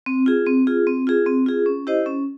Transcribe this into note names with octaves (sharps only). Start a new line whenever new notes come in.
C4
F4 G#4
C4
F4 G#4
C4
F4 G#4
C4
F4 G#4
C#4
E4 G4 C5 D#5
C#4